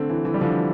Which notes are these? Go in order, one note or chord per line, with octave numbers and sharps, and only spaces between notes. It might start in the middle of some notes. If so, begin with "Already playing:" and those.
Already playing: D3 A3 C4
E3
E3
G3
D3 F3